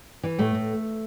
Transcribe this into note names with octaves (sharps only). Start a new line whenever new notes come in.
E3
A2 A3
A2